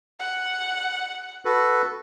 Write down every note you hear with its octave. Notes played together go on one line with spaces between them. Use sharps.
F#5
F#4 A4 B4